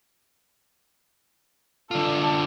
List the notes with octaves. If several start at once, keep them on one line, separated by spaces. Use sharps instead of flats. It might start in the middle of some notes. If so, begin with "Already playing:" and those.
D3 F4 A4 D5